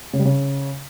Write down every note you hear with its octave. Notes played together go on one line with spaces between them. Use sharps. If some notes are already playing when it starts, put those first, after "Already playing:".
C#3
G3
C#3